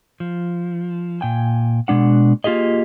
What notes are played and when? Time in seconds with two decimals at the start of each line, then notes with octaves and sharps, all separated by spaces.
0.20 F3
1.21 A#2 G5 G#5
1.88 B2 G#3 D4 F#5
2.44 A#3 F4 G4 G#4 D#5